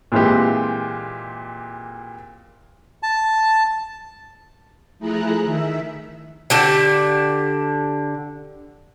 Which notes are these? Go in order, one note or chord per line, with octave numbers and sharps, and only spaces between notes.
A#2 E3 G#3 C4 F4 G4
A5
F3 A3 E4 G#4 A#5 F#6
D#3 E5
D3 G4 A5